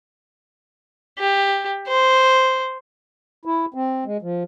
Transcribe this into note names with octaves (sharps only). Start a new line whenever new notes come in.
G4
C5
E4
C4
G#3
F3